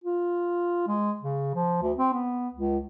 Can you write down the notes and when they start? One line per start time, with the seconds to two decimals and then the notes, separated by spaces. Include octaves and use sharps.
0.04 F4
0.87 G#3
1.22 C#3
1.55 F3
1.82 D2
1.98 C4
2.13 B3
2.54 C#2